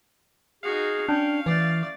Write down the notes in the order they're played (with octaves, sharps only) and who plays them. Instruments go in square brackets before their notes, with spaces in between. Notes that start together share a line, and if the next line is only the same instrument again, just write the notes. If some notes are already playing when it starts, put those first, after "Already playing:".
[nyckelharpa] D#4 F#4 [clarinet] G#4 [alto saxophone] F5
[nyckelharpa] C#4 [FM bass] D4 [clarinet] G5
[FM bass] E3 [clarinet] A3 [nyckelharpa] D5